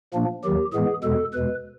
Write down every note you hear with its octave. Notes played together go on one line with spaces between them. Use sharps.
A#2 F3 A#3 D4
D#2 D#3 F#3 G4
A2 E3 G#3 B3 G#4
E2 B2 G#3 A4
E2 B2 G#3 B4